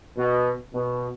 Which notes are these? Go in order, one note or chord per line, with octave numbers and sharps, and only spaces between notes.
B2
B2